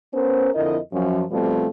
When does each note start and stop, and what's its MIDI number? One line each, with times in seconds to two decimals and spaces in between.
0.14 0.49 59
0.14 0.49 61
0.14 0.49 70
0.14 0.49 72
0.55 0.78 41
0.55 0.78 50
0.55 0.78 64
0.55 0.78 70
0.55 0.78 75
0.93 1.23 42
0.93 1.23 53
0.93 1.23 54
1.31 1.67 47
1.31 1.67 53
1.31 1.67 55
1.31 1.67 57
1.31 1.67 60